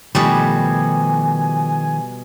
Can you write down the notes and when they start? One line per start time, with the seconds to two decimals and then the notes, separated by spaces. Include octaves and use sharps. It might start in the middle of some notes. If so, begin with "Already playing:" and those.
0.15 B2 D#3 F3 G3 A3 G#5